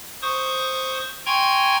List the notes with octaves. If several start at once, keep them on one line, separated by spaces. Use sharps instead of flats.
C5 C#6 D#6
G5 G#5 A#5 C6 C#6 G#6